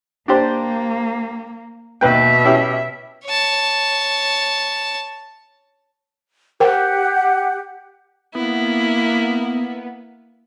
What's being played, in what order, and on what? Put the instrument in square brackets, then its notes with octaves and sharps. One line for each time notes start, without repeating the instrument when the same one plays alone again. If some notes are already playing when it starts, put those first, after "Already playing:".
[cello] A#3 [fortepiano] D4 G4 C5
[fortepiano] D#2 B4 G5 [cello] B2 E5
[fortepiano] C#4 E4 G4
[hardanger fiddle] C#5 A5
[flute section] G4 F#5 [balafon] A#4 C5 G5
[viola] A#3 E4 [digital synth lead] B3